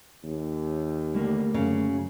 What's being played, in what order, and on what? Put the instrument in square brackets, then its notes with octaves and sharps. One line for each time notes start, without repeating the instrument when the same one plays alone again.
[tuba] D#2
[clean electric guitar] D3 A3 A#3 [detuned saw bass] G3
[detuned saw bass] F#2 [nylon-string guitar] C#3